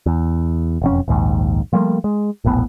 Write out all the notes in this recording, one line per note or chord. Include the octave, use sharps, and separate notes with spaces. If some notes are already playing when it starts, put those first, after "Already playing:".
E2
E1 F2 C#4
A#1 D#2 G#2
F3 G3 A3 A#3
G#3
E1 A#1 A2 B3